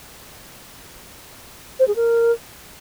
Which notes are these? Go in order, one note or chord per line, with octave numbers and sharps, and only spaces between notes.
C5
G#4
A#4